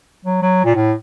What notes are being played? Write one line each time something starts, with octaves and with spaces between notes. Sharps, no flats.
F#3
F#3
A#2
A2